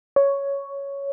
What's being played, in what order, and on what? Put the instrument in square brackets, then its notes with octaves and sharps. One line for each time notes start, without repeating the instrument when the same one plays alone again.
[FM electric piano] C#5